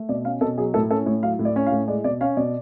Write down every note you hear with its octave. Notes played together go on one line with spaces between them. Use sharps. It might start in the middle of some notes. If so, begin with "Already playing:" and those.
Already playing: A3
B2 D5
C#4 F5
B2 A4
F#3 G#4
A2 A4
C#4 A4
A2 C#5
F#3 F5
A2
D5
C#4
F5
A2
G#3 D5
B2 D5
C#4 F5
B2 D5